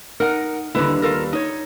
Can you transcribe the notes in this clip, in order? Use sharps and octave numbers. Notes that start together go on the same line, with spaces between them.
D#4 A#4 F#5
D#2 D3 G3 E4 B4
F4 A4 A#4
D#4 C#5